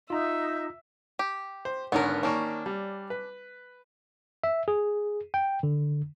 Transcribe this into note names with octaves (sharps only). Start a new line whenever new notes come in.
D#4 F4 E5 A#5
G4
C5
G#1 D3 B3 C#4 A#4
D#3 A#3 C#4 D4 C#6
G3
B4
E5
G#4
G5
D3